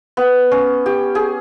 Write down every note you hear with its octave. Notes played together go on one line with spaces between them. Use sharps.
B3
C#4
G4
G#4